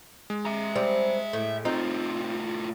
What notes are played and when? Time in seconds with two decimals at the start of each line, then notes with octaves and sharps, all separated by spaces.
0.30 G#3
0.45 E5 A#5
0.76 G3 C4
1.33 A2
1.65 A2 C4 D#4 F4